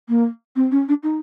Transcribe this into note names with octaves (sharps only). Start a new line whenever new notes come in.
A#3
C4
C#4
D4
D#4